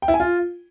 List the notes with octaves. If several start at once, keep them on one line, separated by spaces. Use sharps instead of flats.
G5
E4
G#5
F4